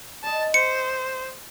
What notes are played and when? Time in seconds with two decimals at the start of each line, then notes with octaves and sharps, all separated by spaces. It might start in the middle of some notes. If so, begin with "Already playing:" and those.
0.23 D5 D#5 A5
0.54 C5 C#7